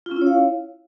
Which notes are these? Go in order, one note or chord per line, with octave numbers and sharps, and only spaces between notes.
F4
C#4
E4
C#5
F5